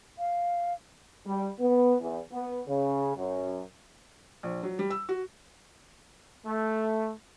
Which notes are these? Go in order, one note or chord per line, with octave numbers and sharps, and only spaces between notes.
F5
G3
B3
E2
B3
C#3
F#2
A#1
F#3
G3
E6
F#4
A3